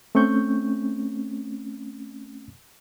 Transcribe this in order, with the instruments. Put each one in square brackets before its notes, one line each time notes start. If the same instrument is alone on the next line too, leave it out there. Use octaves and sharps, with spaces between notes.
[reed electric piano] A3 C4 C#4 C#6 G6